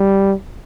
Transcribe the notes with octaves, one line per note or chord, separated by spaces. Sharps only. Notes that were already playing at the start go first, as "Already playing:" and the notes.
Already playing: G3